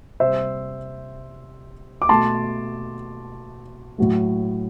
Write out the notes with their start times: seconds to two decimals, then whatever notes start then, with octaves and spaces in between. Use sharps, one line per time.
0.20 C3 G3 C5 E5
2.02 D6
2.09 B2 A3 A5 C6
3.98 A2 F#3 A3